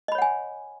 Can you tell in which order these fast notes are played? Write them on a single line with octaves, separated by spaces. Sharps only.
D#5 B5 C#5 F#5 G#5